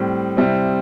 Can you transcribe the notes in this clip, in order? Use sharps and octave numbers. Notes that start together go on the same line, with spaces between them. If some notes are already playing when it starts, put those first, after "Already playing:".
Already playing: A2 G3 C4
C3 G3 C4 E4